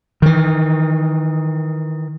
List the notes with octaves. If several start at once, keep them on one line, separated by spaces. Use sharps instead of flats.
D#3 E3